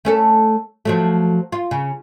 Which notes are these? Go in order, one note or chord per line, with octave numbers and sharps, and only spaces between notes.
A3 C#4 A4
F3 F#3 A3
F4
C#3